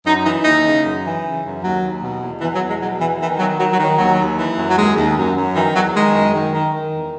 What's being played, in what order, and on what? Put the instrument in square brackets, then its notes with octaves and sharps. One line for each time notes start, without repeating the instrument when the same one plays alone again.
[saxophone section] F#2 D#4
E3 D#4
D#2 D#4
C#3
F#2
E3
C#3
F#2
D#2 F#3
D#2
B2
E2
E2 E3
F#3
E2
G#3
B2 F#3
E2 E3
D#3 E3
D#3 F#3
D#3 F#3
F#3
D#3
F#3
D#2 F#3
D#2
E3
F#2
F#3
D#2 G#3
D#2
F#2
F#2
D#3 E3
E2 F#3
D#3 G#3
F#2
D#3
D#3
D#3
E2